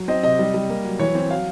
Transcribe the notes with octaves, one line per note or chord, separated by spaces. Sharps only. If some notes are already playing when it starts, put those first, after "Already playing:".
Already playing: F#3
C4 D#5
C3 D#5
G3
G3
A#3
F#3
E3 C#5
C4
F#3 F5